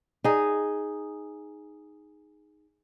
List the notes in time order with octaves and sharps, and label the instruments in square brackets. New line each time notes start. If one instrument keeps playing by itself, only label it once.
[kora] D#4 G#4